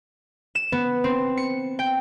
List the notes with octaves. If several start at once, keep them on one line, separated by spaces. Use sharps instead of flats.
E7
B3
C4
C#7
G5